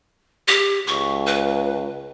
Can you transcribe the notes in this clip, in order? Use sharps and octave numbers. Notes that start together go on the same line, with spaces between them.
G4
C#2 C#6
B4